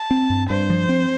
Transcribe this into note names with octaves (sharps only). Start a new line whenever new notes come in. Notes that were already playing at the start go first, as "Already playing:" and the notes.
Already playing: A5
C4
G2
G2 C5
F3
C4